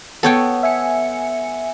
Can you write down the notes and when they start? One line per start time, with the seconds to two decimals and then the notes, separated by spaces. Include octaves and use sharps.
0.23 B3 A4 C#5 G5
0.63 E5 G#5 C#7